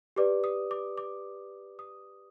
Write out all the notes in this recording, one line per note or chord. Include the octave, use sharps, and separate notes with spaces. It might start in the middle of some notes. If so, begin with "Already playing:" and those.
G4 B4 D5 D6
D#6
D6
D6
D#6